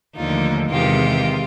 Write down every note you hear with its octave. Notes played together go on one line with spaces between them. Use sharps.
D#2 D3 F3 A3 D#4 F4
E2 C3 D#3 G#3 F4 G4